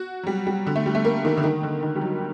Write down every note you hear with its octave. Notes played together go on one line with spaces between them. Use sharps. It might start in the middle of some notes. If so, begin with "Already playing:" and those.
Already playing: F#4
F#3
G3
G3
D3
A3
G3
A3
A#3
D#3
D3
D#3
D3
D#3
G3
F#3